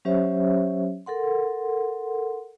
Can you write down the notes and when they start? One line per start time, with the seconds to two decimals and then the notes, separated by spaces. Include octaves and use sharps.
0.05 F#3 C#4 G4 C5 C#5 E5
1.06 A4 A#4 F#5 C6